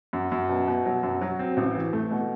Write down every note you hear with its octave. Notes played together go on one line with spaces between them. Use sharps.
F#2
F#2
B2
B2
F#3
F#2
F#3
C4
A1
E3
A3
B2